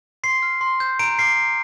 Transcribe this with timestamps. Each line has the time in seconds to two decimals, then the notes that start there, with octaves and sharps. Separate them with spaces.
0.23 C6 C7
0.42 F6
0.61 C6
0.80 G6
0.99 A#5 D7
1.19 D6 F6 C7
1.38 A#5